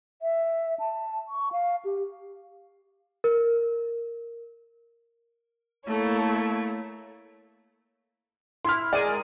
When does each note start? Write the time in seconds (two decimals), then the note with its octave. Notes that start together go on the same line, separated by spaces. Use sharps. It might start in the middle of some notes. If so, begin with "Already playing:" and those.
0.22 E5
0.80 A5
1.28 C#6
1.52 F5
1.85 G4
3.24 A#4
5.87 A3 A#3 E4 A4 C#5
8.65 E4 C6 F6
8.93 G#3 G#4 A#4 D5 D#7